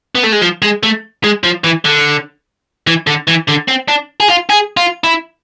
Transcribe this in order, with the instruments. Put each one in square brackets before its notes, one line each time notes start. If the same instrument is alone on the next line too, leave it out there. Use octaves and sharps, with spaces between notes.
[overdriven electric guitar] B3
A3
G#3
F3
G#3
A3
G#3
F3
E3
D3
E3
D3
E3
D3
C4
D4
G#4
F4
G#4
F4
E4